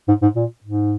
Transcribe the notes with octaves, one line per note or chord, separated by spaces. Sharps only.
G#2
G#2
A#2
G#2